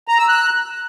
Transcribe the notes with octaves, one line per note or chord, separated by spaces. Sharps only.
A#5
E6
F#6